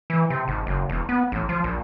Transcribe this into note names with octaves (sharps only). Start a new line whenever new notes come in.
E3
C3
G#1
F#1
E1
B3
A1
F3
A#1